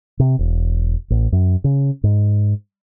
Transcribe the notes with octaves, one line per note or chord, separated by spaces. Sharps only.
C3
E1
A1
F#2
C#3
G#2